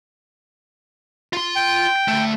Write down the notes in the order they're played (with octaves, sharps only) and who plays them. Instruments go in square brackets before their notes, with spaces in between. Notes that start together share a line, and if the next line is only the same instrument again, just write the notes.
[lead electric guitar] F4 C6
[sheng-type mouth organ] G5
[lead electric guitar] D2 A3